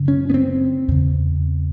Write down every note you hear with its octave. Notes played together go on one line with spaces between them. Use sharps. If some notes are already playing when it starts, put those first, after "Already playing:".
Already playing: F#2 C#3
C#4
B3
C4
E2 C#3